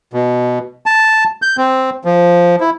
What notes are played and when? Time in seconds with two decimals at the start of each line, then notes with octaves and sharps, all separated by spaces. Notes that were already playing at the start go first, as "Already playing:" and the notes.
0.13 B2
0.86 A5
1.42 G6
1.57 C4
2.05 F3
2.60 E4